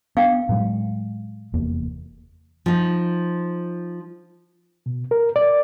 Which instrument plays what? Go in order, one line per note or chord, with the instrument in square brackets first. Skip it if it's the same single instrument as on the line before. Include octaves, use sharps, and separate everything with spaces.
[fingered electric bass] B3 D4 [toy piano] F5 G5
[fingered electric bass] A2 F#3 G#3
F1 E2 A#3
[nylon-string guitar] F3 D#4
[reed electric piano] B2
A#4
D5